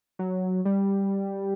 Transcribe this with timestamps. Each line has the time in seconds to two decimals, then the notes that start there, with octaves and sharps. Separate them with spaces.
0.19 F#3
0.65 G3